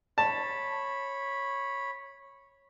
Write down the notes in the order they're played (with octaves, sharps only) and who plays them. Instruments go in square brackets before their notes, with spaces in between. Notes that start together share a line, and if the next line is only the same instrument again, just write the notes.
[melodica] C#5 B5 [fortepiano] A5